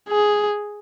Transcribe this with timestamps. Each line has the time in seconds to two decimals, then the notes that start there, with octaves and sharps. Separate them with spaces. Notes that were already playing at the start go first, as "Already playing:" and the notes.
0.09 G#4